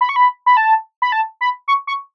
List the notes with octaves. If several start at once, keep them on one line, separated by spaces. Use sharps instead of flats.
B5
C#6
B5
B5
A5
B5
A5
B5
C#6
C#6